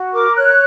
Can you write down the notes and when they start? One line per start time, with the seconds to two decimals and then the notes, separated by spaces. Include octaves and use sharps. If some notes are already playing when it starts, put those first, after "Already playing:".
Already playing: F#4
0.12 A#4 D6
0.35 C#5 F#6